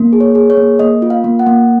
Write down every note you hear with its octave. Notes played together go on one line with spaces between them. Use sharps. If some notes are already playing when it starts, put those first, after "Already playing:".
Already playing: A#3
G#4
C#5
G#4
C#5
A#3
A#3 D#5
F4
F5
A#3
F#5
A#3